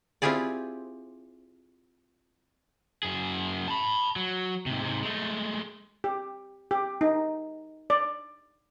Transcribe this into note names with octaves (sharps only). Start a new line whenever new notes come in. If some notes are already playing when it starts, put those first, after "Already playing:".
C4 E4 F4 G4 G#4 D5
F#2 G#4
A5 B5
F#3
G#2 C3
G#2 C3
G#3 A3
G4
G4
D#4
D5